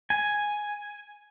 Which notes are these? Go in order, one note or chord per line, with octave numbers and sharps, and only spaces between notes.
G#5